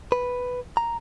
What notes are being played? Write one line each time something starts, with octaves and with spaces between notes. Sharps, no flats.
B4
A#5